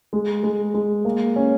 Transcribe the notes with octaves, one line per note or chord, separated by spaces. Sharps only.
G#3
G#3
G#3
A#3
C#4